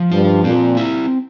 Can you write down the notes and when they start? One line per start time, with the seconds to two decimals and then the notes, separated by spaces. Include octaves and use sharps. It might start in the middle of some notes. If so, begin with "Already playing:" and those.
Already playing: F3
0.11 G2 F4
0.44 A#2 C4
0.77 E4